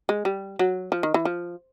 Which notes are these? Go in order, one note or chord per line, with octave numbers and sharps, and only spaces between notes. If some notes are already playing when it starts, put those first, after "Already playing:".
G#3
G3
F#3
F3
D#3
E3
F3